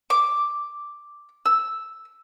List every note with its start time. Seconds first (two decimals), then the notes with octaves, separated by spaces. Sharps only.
0.10 D6
1.46 E6